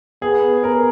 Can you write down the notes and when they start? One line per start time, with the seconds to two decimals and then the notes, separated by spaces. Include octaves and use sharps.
0.22 B3 G#4
0.64 A#4